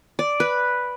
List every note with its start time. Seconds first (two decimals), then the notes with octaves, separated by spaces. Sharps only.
0.19 D5
0.40 B4